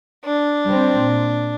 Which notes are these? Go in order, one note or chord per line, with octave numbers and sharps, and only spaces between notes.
D4
G3 C4
A#2